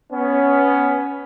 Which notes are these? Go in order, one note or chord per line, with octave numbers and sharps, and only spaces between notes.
B3 C#4